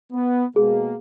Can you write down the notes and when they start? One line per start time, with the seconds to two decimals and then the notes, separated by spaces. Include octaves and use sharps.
0.13 B3
0.56 B2 G#3 A#3 G#4